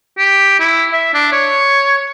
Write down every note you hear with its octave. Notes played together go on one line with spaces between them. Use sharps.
G4
E4
E5
D4
C#5